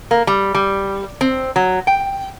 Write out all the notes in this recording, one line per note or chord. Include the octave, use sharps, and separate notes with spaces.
A#3
G3
G3
C4
F#3
G5